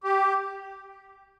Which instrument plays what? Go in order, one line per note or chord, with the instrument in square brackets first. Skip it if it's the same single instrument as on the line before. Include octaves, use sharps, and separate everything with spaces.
[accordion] G4